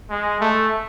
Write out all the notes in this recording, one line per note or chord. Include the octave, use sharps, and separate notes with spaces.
G#3
A3